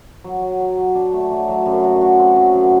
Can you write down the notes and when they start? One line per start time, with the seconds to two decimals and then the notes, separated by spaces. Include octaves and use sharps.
0.24 F#3
0.41 F#3
0.60 F#3
0.77 F#3
0.95 D4
1.13 A3
1.31 F#3
1.48 F#3
1.66 F#2
1.84 F#4
2.01 F#4
2.19 C4
2.36 F#3
2.54 F#2